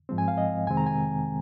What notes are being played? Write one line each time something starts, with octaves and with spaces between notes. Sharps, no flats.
G#2 F3 G#3 C4
G#5
F5
D#5
F2 C3 D#3 G#3 C4 G#5
A#5
G#5